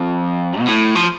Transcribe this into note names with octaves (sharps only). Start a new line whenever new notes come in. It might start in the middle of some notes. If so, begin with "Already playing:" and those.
Already playing: F2
B2
A2
F3